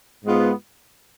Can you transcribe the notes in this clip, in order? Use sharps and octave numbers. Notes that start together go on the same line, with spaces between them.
G#2 G#3 B3 F4